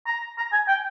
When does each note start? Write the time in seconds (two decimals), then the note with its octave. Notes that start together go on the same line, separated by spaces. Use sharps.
0.06 A#5
0.38 A#5
0.52 G#5
0.68 G5